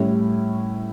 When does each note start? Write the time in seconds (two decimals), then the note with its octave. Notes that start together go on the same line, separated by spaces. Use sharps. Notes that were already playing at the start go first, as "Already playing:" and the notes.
Already playing: A2 G3 C#4 E4